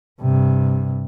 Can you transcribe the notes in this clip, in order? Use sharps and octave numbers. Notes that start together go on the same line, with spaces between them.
G2 C3